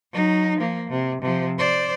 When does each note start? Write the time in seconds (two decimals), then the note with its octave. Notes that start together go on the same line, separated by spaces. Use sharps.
0.12 F#3 D#4
0.59 F3 A#3
0.90 C3
1.22 C3 F3
1.58 C5 D5